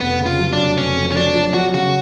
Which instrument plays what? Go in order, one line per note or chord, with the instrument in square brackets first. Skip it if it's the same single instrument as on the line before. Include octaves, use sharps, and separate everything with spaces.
[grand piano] F1 [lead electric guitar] B3
[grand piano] C#3
[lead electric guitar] F4
[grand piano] F#3
[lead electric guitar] D4
[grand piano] F1
[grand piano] F1 [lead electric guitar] C#4
[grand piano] F2
[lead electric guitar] C#4
[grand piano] F#3 [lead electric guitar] D4
[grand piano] F#3
[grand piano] F#3 [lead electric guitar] F#4
[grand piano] C#3 [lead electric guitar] F#4